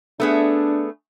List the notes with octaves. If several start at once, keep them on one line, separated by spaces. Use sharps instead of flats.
A3 B3 D4 G#4